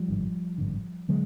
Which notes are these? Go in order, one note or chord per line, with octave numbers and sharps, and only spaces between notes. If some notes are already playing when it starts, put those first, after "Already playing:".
Already playing: F3 G3
G#1 G2 D3
G#1 G2 D3
D3 F#3 G#3